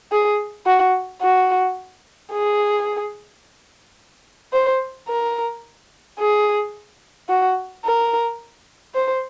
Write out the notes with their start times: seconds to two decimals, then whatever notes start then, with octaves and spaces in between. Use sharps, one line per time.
0.12 G#4
0.66 F#4
1.22 F#4
2.33 G#4
4.53 C5
5.08 A#4
6.19 G#4
7.29 F#4
7.84 A#4
8.94 C5